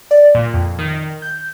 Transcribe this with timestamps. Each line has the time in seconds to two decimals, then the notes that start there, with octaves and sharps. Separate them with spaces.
0.11 D5
0.35 A#2
0.54 F2
0.79 D#3
1.22 G6